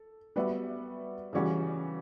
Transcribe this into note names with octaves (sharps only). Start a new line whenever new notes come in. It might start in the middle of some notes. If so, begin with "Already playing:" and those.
Already playing: A4
G3 B3 F#4 B4 E5
C#3 E3 G3 C#4 F#4